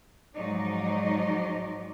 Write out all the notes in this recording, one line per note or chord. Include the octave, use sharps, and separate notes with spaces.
G#2 F3 F#3 D#4 D5 D#5